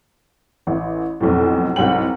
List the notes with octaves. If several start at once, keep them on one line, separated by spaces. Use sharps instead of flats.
A1 E3
F1 B1 F2 A2
C2 G#2 F#3 G5 F#7